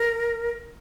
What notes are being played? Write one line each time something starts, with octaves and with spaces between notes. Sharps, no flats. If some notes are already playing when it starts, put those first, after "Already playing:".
Already playing: A#4